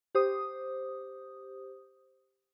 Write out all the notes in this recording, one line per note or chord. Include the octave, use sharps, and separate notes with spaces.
G4 C5 D#6